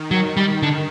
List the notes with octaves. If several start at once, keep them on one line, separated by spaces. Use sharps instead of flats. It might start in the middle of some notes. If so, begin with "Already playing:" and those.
Already playing: D#3
F#3
G3
D3